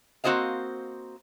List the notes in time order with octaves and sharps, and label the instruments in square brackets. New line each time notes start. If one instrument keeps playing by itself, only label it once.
[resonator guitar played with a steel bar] A#3 C4 F#4 C5 D#5 F5